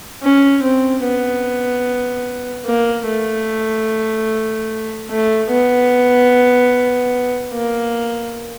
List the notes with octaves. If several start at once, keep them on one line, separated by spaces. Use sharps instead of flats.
C#4
C4
B3
A#3
A3
A3
B3
A#3